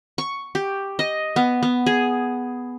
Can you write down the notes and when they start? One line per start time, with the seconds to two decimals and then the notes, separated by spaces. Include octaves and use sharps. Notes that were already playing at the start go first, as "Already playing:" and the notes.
0.18 C#6
0.55 G4
0.99 D#5
1.36 B3
1.63 B3
1.86 G#4